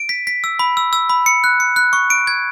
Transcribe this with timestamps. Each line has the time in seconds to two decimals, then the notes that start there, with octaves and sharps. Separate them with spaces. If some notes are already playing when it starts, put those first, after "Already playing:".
Already playing: D7
0.09 B6
0.27 B6
0.44 E6
0.59 B5
0.77 E6
0.93 E6
1.09 B5
1.26 C#7
1.44 F#6
1.60 C#7
1.76 F#6
1.93 C#6
2.10 D7
2.27 G#6